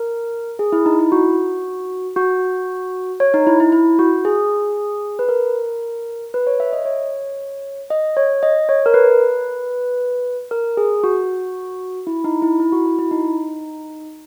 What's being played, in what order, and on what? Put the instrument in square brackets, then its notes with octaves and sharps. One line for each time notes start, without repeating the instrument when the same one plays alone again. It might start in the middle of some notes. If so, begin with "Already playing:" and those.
Already playing: [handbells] A#4
G#4
E4
D#4
E4
F#4
F#4
C#5
D#4
E4
E4
E4
F#4
G#4
B4
A#4
B4
C#5
E5
D#5
C#5
D#5
C#5
D#5
C#5
A#4
B4
A#4
G#4
F#4
E4
D#4
E4
E4
F#4
F#4
E4
D#4